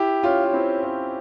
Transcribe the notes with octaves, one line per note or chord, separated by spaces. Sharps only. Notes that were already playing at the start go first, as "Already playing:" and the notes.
Already playing: E4 G4
C#4 F4
F4
C4 E4
C#4 F4